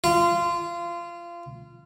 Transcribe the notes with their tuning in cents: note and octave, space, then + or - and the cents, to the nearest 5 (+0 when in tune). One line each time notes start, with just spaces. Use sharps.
F4 -25